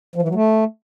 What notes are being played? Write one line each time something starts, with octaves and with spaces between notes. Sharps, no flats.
F3
E3
F#3
A3